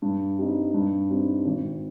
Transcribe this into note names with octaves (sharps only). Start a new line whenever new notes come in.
G2
G3 C4 D#4
G2
G3 C4 D#4
G#1